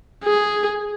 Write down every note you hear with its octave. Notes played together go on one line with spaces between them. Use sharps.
G#4